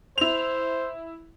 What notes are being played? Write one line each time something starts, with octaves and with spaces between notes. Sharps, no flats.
E4 C5 F7